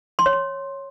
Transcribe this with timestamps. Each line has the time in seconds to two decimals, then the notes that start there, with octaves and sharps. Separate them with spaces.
0.19 C6
0.26 C#5
0.33 C6